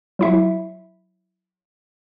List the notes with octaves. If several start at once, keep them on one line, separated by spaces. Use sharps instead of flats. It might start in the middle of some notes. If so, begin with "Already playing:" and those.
F#3 E4 E5